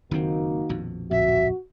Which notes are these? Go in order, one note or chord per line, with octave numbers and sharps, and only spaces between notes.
F#1 F2 D#3 A#3 C4 D#4 F#4
A#1 F2 B2
D1 A#1 F2 F#4 E5